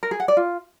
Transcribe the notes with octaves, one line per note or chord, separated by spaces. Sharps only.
A#4
G#4
F#5
D5
F4